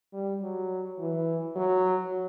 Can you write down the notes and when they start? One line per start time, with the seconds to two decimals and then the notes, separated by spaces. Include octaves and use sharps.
0.13 G3
0.42 F#3
0.98 E3
1.56 F#3